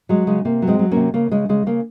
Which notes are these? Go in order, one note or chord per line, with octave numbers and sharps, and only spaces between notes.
F#3 G#3
C#3 G#3
C3 A#3
F#3
G#3 C4
F#3
C3 A#3 C#4
C#3 A#3
C#3 G#3
C#3 G#3
C#3 A#3